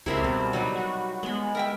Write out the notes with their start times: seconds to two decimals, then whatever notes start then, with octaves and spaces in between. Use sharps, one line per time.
0.06 C#2 C3 E4 G#4 A#4 E5 C6
0.24 B2 G3
0.53 F#3 G3 D#4 B4
0.76 F#4
1.23 G#3 B3 B5
1.55 A#4 E5 G5